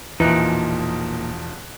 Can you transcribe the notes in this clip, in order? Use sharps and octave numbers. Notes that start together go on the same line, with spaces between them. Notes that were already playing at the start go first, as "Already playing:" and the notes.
E1 A#2 E3 F3 D#4 F#6